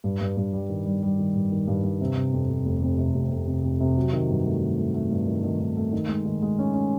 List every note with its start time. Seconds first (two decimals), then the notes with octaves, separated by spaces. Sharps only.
0.04 G2
0.21 G2
0.37 G2
0.53 G3
0.69 D#3
0.86 G3
1.03 G3
1.19 D#3
1.35 G2
1.52 D#3
1.68 G2
1.84 G2
2.01 C3
2.16 C3
2.33 F2
2.50 F2
2.65 F1
2.82 F2
2.99 C3
3.14 F1
3.32 F1
3.47 C3
3.64 F2
3.80 C3
3.97 F#3
4.13 D#3
4.29 G2
4.46 A3
4.63 D#3
4.78 A3
4.94 A3
5.11 G2
5.27 D#3
5.44 D#3
5.60 D#3
5.77 A3
5.93 D#3
6.09 G#3
6.26 D#3
6.42 G#3
6.59 C#4
6.74 C#4